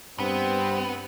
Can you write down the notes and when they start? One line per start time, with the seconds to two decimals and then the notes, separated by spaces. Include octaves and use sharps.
0.19 G2 B3 C4